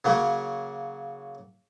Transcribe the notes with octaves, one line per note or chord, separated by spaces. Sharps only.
C#3 F#3 A#3